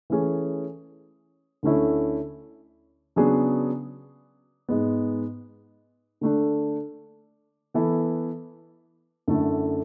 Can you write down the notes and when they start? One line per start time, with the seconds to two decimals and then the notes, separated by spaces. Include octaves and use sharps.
0.10 E3 A3 C#4 G#4
1.63 D2 D3 A3 C#4 E4
3.16 C#3 F#3 B3 D4 G#4
4.69 G#2 G#3 B3
6.21 D3 A3 D4
7.74 E3 B3 E4 A4
9.28 F#2 D3 A3 E4 A4